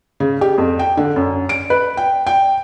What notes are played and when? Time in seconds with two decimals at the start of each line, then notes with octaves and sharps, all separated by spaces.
0.20 C#3
0.41 G4
0.58 F2
0.79 G5
0.97 D3
1.16 F#2
1.49 D7
1.70 B4
1.97 G5
2.27 G5